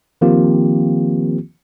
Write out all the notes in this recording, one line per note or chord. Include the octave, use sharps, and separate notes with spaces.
D#3 F3 A#3 C4 F4 G4